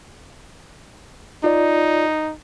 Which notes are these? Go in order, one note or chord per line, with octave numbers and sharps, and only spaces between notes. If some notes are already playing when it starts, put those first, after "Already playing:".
D#4 F4 D5